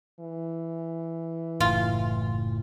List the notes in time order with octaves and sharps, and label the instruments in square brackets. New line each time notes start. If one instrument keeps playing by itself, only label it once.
[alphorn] E3
[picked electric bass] F#1 A2 [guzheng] F4